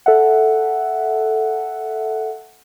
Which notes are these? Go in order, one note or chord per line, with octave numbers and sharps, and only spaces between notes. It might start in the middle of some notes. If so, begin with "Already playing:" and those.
A4 E5 F#5